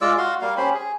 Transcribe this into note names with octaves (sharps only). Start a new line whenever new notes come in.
G#3 F4 D5 E6
F#4 F5 C6
G3 A#3 F5
C#4 G4 C5 B5
G#4